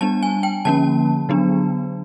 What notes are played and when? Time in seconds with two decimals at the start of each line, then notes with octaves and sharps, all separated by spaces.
0.01 G3 B3 D4 A5
0.23 G#5
0.43 G5
0.65 D3 F3 A#3 C#4 A5
1.29 D3 F#3 B3 D4